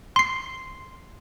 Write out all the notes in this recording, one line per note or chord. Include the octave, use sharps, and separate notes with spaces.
C6 C7